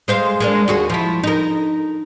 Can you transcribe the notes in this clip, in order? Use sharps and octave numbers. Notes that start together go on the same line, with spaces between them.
G#3 C5 F5
G#3 A#3 D4
D#2 F#4 G#4
F3 E4
D#4 A#4